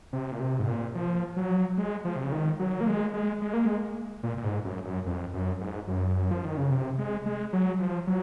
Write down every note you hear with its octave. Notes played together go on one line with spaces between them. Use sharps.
C3
A#2
C3
G#2
A#2
F3
F#3
G#3
F3
C3
C#3
D#3
F#3
A#3
G#3
G#3
G#3
A#3
G#3
A#2
A#2
G#2
F#2
F#2
F2
F#2
G#2
F#2
F3
D#3
C#3
C3
G#3
G#3
F#3
F3
F#3